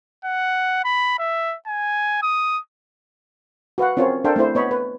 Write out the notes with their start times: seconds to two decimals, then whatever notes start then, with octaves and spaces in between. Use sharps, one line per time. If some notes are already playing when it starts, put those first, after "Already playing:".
0.25 F#5
0.85 B5
1.19 E5
1.67 G#5
2.22 D#6
3.78 F#4 B4 F5 F#5
3.97 C4 C#4 F4 A#4 C#5
4.24 D4 A4 A#4 C5 F5 G5
4.36 A3 C4 E4 C5
4.55 B3 C#5 D#5 B5
4.71 B4